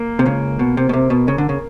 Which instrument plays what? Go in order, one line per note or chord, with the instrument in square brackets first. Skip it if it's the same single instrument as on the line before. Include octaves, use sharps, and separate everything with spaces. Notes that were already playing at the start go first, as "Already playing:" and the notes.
Already playing: [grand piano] A#3
[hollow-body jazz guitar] C3
C#2 C#3
B2
C3
B2
C3
B2
C#3
D3
C#3